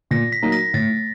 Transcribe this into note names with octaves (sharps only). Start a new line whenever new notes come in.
A#2 A#6
B6
F#3 A#3 D#4
A#6
A2 A6